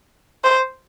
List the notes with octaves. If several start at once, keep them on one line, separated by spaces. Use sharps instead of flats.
C5